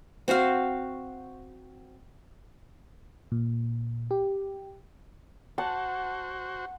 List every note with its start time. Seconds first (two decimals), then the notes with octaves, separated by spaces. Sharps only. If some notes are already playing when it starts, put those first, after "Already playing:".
0.28 C4 F#4 C5 F5
3.32 A#2
4.11 G4
5.58 F#4 C5 F#5 A5